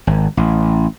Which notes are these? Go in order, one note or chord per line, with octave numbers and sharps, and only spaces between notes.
G#1
A1